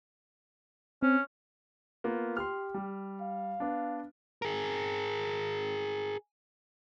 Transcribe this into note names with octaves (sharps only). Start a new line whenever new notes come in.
C4 C#4
A#3 B3 F4
G4 C6 F6
G3
F5
B3 D4
G#4 A#4